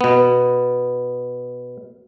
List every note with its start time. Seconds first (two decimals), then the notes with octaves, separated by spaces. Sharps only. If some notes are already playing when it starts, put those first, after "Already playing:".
0.01 B2 B3